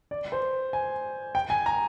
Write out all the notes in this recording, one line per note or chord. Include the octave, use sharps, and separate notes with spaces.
D5
C5
G#5
G5
G#5
A#5